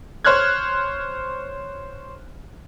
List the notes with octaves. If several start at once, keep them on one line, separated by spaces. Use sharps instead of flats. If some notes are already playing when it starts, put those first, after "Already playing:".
C5 C#5 F6 F#6 G#6